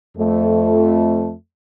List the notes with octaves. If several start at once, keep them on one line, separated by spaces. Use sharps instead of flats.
F2 A3